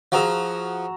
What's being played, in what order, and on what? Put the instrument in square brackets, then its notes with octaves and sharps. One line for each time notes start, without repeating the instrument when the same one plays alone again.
[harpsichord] F3 F4 G#4 [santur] F#4 A#5 E6